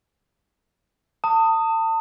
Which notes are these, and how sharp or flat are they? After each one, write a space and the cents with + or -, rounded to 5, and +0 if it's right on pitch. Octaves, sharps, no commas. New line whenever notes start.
A5 +35 D#6 +0